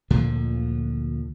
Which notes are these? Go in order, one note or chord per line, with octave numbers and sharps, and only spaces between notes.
D2 A#2 D3 F3